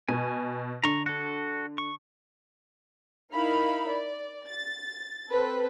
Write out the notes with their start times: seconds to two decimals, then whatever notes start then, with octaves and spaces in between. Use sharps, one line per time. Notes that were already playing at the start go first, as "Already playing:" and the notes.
0.09 B2 G#5
0.84 D3 A#5 C#6
1.06 F#4 A4
1.78 C#6
3.32 D#4 E4 A#4 F5 B5
3.88 D5
4.46 A6
5.29 C4 A4 B4 C5